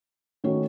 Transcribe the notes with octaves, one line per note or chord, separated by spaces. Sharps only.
D#3 A3 C#4 F#4 C#5